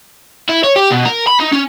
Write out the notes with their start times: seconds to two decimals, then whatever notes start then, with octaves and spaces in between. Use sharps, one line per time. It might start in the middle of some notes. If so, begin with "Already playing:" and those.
0.49 E4
0.64 C#5
0.76 G4
0.91 B2
1.06 A#4
1.27 B5
1.40 D#4
1.53 C#4